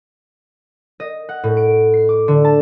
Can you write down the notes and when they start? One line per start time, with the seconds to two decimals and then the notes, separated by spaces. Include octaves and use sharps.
1.00 D#5
1.29 F#5
1.43 A2
1.57 D7
1.94 C7
2.09 D6
2.28 D3
2.45 A5